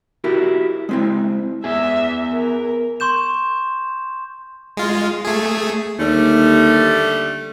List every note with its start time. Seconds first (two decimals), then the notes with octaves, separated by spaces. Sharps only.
0.24 E4 F#4 G4 A#4
0.89 G#3 C4 E4
1.64 B3 G#4 E5
2.32 A#4
3.00 C6 C#6 G6 E7
4.77 G#3 F4
5.25 A3 G#4
5.98 D#2 D3 G3 A3